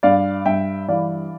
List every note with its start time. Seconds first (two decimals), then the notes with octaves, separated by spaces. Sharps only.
0.03 G2 D5 F5
0.46 G2 E5 G5
0.89 E3 D5 F5